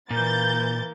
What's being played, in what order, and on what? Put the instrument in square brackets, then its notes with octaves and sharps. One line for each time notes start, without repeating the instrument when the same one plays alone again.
[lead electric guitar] A#2 [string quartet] E3 A#3 [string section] G6 A6